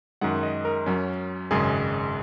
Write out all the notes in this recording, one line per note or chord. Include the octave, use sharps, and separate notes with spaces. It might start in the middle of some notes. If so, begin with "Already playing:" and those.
F#2 D#3 G#3 F#5
D#5
A#4
F#2 F#3 C#4
G#1 F#2 C#3 G#3 G#4